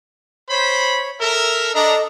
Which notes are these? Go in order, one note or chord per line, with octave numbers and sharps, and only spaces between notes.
C5 C#5 B5
A4 A#4 E5
D4 A4 D#5 A#5